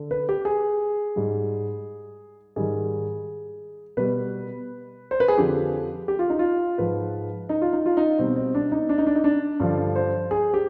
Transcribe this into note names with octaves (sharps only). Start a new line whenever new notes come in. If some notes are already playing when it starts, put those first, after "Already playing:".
Already playing: D3
B4
G4
G#4
G#2 G3
G#2 D#3 G3 G#4
B2 G3 B4
C5
B4
G#4
F2 D3 F3 G4
G4
F4
D#4
F4
G#2 F3 B4
D#4
F4
D#4
F4
D#4
B2 G3 C4
C4
D4
D#4
D4
D#4
D4
D#4
D4
G2 D3 F3
C5
G#4
G4